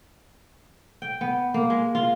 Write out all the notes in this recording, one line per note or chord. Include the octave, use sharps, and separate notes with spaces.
G5
B3
A#3
G#3
F4